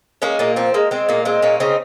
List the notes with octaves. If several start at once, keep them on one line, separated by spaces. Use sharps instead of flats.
G#3 A#3 C#4
A#2 A#3
F3 C4
G#3 A#3
G#3 C4
A#2 A#3
G#3 C4
A#2 A#3 C#4
C#3 C4 D#4